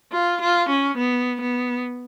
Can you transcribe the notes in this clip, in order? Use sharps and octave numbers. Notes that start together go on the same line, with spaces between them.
F4
F4
C#4
B3
B3